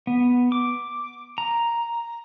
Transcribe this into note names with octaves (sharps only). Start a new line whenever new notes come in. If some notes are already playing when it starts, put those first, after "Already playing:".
B3
D6
A#5